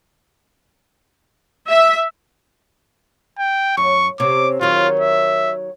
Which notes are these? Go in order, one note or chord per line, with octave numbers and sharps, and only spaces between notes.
E5
G5
F#2 C#6
C3 C#4 D6
D#3 F#3 F4
E5